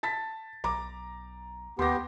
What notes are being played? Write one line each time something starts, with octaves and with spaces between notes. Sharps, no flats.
A5 A6 B6
B1 A#5 D6
D#2 B3 G4 C6 A#6